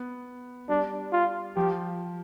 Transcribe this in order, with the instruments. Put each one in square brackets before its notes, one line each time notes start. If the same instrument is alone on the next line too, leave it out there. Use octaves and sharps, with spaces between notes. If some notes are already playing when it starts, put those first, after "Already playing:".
Already playing: [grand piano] B3
[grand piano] G3 [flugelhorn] D4
[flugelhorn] F4
[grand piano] F3 [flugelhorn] G4